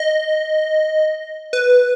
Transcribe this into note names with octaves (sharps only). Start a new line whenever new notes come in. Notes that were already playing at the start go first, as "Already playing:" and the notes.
Already playing: D#5
B4